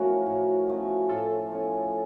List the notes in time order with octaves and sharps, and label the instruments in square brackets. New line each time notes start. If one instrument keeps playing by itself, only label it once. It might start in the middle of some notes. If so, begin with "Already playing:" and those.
Already playing: [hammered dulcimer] A2 F3 A3 C#4 [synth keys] F#4 A#4
[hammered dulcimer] A2
F3 A3 C#4
[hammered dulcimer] A2 [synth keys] F4 A4
[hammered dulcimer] F3 A3 C#4